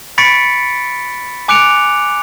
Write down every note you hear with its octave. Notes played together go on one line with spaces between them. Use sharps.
B5 C#6 A6 B6 C#7 D7
G#5 D6 F#6 C#7 D7 F7